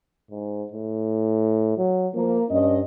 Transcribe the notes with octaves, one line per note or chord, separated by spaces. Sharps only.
G#2
A2
F#3
F3 A#3
G2 C#4 D#5